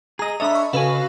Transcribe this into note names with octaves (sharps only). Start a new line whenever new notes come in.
G#4 D#5 A#5 D#6
D4 A4 C#5 D#5 E5 B5
C#6
C#3 F#4 A4 B4 E5 F5 G#5